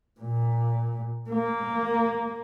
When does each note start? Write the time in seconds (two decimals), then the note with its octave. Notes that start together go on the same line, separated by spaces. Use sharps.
0.20 A#2
1.30 A#3